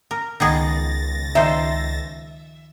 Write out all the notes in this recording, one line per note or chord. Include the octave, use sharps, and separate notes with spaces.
A#4
C#2 D#3 B3 G#4 A6 A#6
D#3 F3 C5 E5